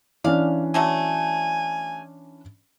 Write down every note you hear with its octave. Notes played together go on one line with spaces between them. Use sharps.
E3 C#4 D4 D5 F5
D3 F#3 A3 G#5